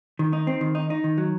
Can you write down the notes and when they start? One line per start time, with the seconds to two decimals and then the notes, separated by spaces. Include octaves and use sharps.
0.19 D#3
0.33 D#4
0.47 C4
0.61 D#3
0.75 D#4
0.90 D#4
1.04 D#3
1.18 F#3